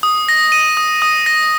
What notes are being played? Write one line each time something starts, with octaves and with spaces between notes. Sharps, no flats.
D#6
A#6
D#7
D#6
D#6
A#6